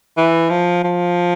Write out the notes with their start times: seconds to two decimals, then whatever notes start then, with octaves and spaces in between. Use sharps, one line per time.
0.17 E3
0.50 F3
0.84 F3